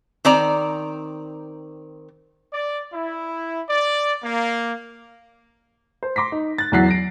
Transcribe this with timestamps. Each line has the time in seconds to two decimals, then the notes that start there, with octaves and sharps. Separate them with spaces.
0.25 D#3 C4 D5 A#5
2.54 D5
2.93 E4
3.70 D5
4.24 A#3
6.03 C5
6.16 C6 D6 A#6 B6
6.32 D#4
6.58 F#6 A6
6.72 E2 E3 F#3 F#6 B6 C7
6.86 A6 A#6 D7